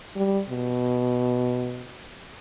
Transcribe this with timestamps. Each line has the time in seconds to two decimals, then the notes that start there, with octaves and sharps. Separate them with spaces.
0.16 G3
0.50 B2